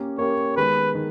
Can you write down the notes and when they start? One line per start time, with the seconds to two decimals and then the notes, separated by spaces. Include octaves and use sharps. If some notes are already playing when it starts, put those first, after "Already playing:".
Already playing: A#3 C#4 G4 A#4
0.18 A#3 C#4 G4 A#4 C#5
0.56 D#3 G#3 B3 B4
0.95 D#3